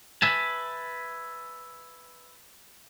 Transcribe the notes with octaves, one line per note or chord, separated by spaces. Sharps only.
B4 E5 G#5 A5